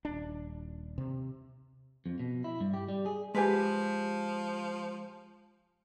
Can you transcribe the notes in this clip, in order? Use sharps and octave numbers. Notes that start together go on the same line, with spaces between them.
D#1 D4
C3
F2
B2
E4
G2
G4
G3
G#4
F3 G#3 G4 B4 G#5